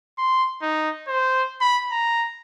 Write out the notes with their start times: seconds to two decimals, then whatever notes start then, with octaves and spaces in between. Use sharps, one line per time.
0.19 C6
0.62 D#4
1.08 C5
1.61 B5
1.92 A#5